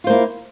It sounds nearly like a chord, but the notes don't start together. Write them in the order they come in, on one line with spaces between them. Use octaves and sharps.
F4 C5 A#3 E4